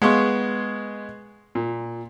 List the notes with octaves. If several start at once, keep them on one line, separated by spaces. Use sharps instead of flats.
G#3 B3 F5 C6 C#6
A#2